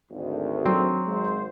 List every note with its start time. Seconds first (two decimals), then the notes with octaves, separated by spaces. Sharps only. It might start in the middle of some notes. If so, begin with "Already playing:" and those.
0.11 G#1 D2
0.65 F#3 C4
1.06 G#1 G#3 C5